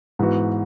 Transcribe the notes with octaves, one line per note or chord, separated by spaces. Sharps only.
G#2 E3 B3 F#4